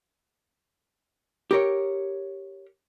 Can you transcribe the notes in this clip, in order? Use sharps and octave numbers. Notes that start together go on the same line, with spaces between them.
G4 A#4 C#5